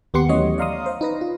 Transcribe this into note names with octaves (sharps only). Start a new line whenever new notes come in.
D#2 B3 G4 F#5 C6 C#7
E3 F#3 A3 C#4 C#5 D#5
D5 D#5 F5 A#5 C6 D#6
C5 F5
D#4 B4 A#6
F4